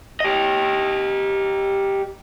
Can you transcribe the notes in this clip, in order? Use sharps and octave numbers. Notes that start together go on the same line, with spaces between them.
G4 D#5